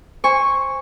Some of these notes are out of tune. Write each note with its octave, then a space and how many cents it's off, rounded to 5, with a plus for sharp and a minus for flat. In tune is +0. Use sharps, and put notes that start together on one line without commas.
C5 +10 G#5 -25 C#6 +0